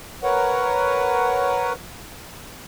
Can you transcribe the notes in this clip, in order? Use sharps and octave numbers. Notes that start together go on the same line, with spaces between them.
A#4 B4 C#5 F#5